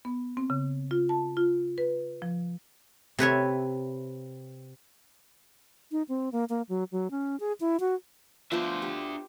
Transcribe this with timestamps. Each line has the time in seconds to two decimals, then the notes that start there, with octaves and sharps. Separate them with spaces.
0.05 B3
0.37 C4
0.50 C#3
0.91 F4
1.09 A5
1.37 F4
1.78 B4
2.22 F3
3.19 C3 B4 C#5 E5
5.92 D#4
6.09 C4
6.32 A#3
6.49 A#3
6.69 F#3
6.92 F#3
7.11 C#4
7.40 G#4
7.60 E4
7.80 F#4
8.52 F3 B3 D4 C5 E5
8.82 G4